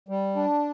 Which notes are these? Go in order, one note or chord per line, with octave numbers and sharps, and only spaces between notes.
G3
D4